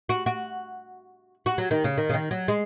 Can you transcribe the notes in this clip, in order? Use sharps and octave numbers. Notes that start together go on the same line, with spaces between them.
F#4
F#4
F#4
F#3
D#3
C#3
D#3
C#3
D#3
F#3
G#3